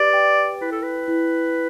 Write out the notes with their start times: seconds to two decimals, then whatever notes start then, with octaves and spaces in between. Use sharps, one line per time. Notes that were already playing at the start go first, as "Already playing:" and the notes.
Already playing: G4 B4 D5
0.13 G5
0.61 E4 B4
0.72 A4
0.83 B4
1.08 E4